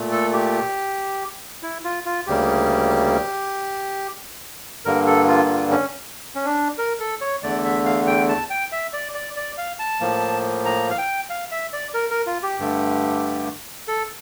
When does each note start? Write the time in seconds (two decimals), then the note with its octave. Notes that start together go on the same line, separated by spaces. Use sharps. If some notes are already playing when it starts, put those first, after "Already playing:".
Already playing: A#2 A3
0.12 A4
0.34 G4
1.63 E4
1.84 F4
2.05 F4
2.27 D2 C#3 G3 A#3 G4
4.85 G2 D3 G3 A#3 A#4
5.07 A4
5.28 F4
5.49 F4
5.71 C#4
6.35 C#4
6.46 D4
6.78 A#4
7.00 A4
7.21 C#5
7.43 E2 D3 A3 D5
7.64 E5
7.86 F5
8.07 G5
8.29 A5
8.50 G5
8.72 E5
8.93 D5
9.14 D5
9.37 D5
9.58 F5
9.79 A5
10.01 A2 F3 A#3
10.65 A#5
10.91 F5
10.98 G5
11.30 F5
11.52 E5
11.73 D5
11.94 A#4
12.11 A#4
12.27 F4
12.43 G4
12.59 G2 D3 A3
13.88 A4